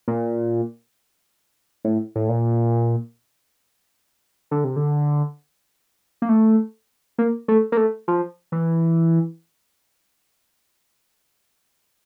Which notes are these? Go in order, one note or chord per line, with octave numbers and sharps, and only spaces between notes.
A#2
A2
A2
A#2
D3
C3
D3
A#3
A3
A#3
A3
A#3
A3
F3
E3